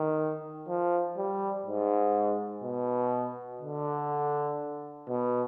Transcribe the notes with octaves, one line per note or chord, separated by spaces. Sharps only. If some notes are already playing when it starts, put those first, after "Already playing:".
Already playing: D#3
F3
G3
G#2
B2
D3
B2